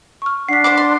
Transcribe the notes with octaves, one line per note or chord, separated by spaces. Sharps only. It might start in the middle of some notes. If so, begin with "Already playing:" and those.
C#6 F6
D4 F#5 B6 C7
C5 C6 D6
C6